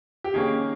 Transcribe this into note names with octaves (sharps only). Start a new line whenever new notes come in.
G4
D#3 A#3 C#4 G#4